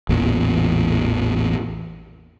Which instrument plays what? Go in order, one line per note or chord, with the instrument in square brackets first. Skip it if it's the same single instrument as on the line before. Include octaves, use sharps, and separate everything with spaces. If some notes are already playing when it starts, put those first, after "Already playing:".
[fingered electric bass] A1 E2 A#2